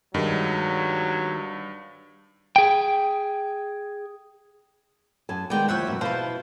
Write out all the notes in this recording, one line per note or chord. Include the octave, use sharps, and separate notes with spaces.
G2 D#3 F#3 G#3
G#4 G5
F#2 G#5 A5
D#3 G#3 B3 D5 G5
D#2 F3 C#5 E5 F#5
F#2 B2
B2 E4 B4 C5 F5 A5